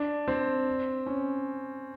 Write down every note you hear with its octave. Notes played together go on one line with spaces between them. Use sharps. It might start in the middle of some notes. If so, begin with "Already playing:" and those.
Already playing: D4
C4
C#4